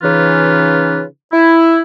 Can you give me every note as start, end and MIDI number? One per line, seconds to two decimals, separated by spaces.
0.03 1.02 49
0.03 1.02 52
0.03 1.02 61
0.03 1.02 63
0.03 1.02 65
0.03 1.02 71
1.32 1.80 64